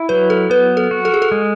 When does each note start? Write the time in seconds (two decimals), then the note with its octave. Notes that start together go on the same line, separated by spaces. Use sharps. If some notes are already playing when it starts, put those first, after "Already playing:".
Already playing: E4
0.09 F#3 B4
0.30 A4
0.50 B3 B4
0.77 A4
0.91 F#4
1.05 A4
1.14 G#4
1.22 A4
1.32 G#3